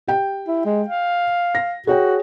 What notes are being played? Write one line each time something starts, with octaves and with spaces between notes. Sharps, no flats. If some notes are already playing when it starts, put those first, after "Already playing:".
G4 G5
E4
G#3
F5
A#6
F#4 G#4 C#5 G5